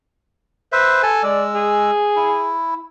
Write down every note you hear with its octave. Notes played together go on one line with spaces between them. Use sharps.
B4 C5 E5
A4 G#5 A5
G#3 D5 E6
G#4
E4